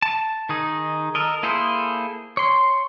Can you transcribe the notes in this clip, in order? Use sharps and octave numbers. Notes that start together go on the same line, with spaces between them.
A5
D#3 D#4 G#4
A4 A#4 D#5
A#3 E4 G#4 A4 C5
C#5 C6